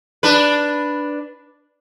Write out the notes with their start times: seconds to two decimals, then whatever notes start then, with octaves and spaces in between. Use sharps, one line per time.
0.23 D4 B4